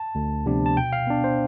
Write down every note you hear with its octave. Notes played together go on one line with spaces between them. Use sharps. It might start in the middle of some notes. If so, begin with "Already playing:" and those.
Already playing: A5
D2
C3 F3 B3 D4
A5
B2 G5
F5
B3 D4
C5